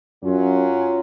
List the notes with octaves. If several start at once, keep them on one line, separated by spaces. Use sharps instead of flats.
F#2 F#3 C#4 F4